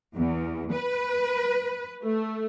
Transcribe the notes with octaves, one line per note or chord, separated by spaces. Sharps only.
E2
B4
A3